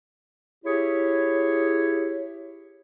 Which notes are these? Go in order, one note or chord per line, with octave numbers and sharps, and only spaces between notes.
E4 G4 G#4 C#5